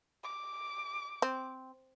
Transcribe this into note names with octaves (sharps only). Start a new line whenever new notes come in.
D6
C4